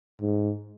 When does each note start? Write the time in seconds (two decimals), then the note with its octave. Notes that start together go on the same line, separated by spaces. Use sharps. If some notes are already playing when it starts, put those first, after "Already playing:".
0.21 G#2